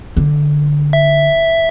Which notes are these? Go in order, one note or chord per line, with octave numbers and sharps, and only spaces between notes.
D3
E5